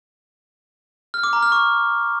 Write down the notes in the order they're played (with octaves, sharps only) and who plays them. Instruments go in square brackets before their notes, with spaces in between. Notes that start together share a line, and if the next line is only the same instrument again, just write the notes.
[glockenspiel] F6
D6
A#5
F6
C#6